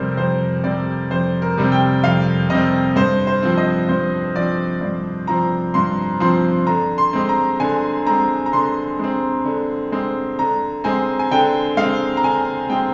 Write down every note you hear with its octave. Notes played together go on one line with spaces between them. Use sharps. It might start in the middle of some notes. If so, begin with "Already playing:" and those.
Already playing: F2 C3 G3 C4 A#4 C5
F2 C5
C3 G3 C4 D5
F2 C5
A#4
C3 G3 C4
G5
F2 F5
C3 G3 C4 D#5
G2 C5
C5
F3 C4
D#5
G2 C5
F3 C4 D5
G2 D5
F3 C4 A#5
G2 C6
F3 C4 C6
D3 A#5
C6
G#3 C4
A#5
D3 G#5
G#3 C4 A#5
A#5
D3 C6
G#3 C4
D3
G#3 C4
D3 A#5
G#3 C4 G#5
G#5
D3 G5
G#3 C4 F5
A#5
D3 G#5
G#3 C4 G5